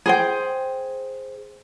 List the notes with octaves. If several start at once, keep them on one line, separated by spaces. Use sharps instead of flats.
G#4 C5 G5